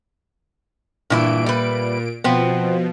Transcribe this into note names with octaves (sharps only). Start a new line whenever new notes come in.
G2 A#2 E3 E4 D7
G3 B4
B2 F3 B3 C4